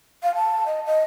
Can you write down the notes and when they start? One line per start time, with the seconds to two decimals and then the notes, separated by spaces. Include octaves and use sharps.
0.23 F5
0.35 A5
0.66 D#5
0.85 D#5